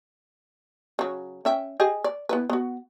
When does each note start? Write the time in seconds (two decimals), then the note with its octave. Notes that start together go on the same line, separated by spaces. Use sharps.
0.99 C#3 F#3
1.45 C#4 E5 G5
1.80 G4 G#4 D#5
2.04 D5
2.29 B3 E4 B4
2.50 B3 F#4